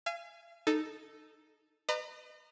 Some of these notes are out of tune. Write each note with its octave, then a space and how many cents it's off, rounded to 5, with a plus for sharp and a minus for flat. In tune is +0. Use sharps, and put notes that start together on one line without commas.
F5 -40 G#5 +0
D#4 -10 A4 +0
B4 +25 D#5 -40 A#5 -10